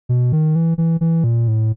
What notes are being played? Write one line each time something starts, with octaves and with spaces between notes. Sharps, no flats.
B2
D#3
E3
E3
E3
A#2
A2